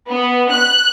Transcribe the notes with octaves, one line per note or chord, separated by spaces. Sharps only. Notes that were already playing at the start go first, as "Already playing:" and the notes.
B3
F#6